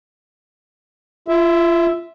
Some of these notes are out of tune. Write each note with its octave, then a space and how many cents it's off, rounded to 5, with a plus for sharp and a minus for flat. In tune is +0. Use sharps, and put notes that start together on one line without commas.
F4 -30 E5 +0